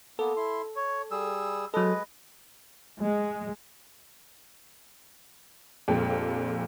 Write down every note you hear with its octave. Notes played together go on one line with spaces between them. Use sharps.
A#3 B3 A4
E4 C6
C#5
G3 G#4 E6
F#3 G#3 A4 B4 D#5
G#3
A#1 F2 A#2 G#3 G4 A4